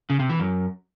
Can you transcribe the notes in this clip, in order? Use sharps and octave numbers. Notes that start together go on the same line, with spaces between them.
C#3
C3
E3
F#2